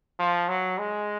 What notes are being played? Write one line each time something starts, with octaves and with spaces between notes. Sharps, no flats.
F3
F#3
G#3